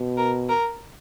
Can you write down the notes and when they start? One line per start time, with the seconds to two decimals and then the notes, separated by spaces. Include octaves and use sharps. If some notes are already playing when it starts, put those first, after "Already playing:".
Already playing: B2
0.17 A#4
0.49 A#4